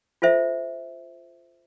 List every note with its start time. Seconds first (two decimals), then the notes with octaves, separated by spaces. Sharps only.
0.22 F4 A4 C5 E5